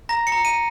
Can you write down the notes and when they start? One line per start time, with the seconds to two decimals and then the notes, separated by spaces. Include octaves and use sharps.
0.09 A#5 A#6
0.27 C#7
0.32 A#5
0.45 D#7